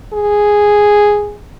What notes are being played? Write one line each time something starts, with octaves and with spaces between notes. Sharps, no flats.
G#4